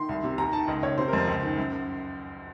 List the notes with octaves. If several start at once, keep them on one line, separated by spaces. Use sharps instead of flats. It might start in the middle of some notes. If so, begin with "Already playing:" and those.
Already playing: D#3 C6
C2
C3
D#2 A#5
D#3 A5
C#2 D#5
C#2 C#5
C3 C5
A#4
F2 C5
C#2
D#3
F#2
F#2